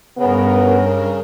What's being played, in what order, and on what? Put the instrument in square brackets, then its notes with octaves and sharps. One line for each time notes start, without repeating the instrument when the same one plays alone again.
[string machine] G2 A#4 [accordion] C#3 [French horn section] B3